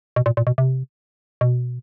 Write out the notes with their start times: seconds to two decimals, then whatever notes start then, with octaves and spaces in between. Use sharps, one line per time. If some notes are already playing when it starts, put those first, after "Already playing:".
0.16 B2
0.26 A#2
0.37 A#2
0.47 B2
0.58 C3
1.41 B2